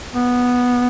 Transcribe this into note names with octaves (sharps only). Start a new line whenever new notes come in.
B3